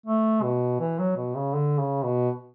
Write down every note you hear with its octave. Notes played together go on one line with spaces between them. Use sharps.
A3
B2
E3
F#3
B2
C#3
D3
C#3
B2